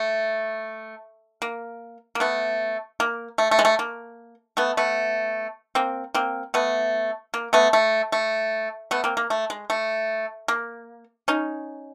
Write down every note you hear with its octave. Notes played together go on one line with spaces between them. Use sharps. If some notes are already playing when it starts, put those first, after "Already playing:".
Already playing: A3
A#3
A#3
A3 B3
A#3
A3
A3
G#3
A3
A#3
A3 B3
A3 B3
A#3 C4
A#3 C4
A3 B3
A#3
A3 B3
A3
A3
A3 B3
A#3 C4
A#3
A3
G#3
A3
A#3
C#4 D#4